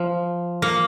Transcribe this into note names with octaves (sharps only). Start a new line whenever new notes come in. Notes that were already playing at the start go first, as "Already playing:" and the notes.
Already playing: F3
A#3